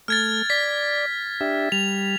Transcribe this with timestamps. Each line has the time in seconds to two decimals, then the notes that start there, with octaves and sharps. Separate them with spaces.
0.08 A3 F6 G#6 A6
0.50 D5 B6
1.41 D4 G4 E5
1.72 G3 F7